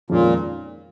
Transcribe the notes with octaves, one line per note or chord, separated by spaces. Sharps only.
F2 A#2 D#3 G#3 C#4 F4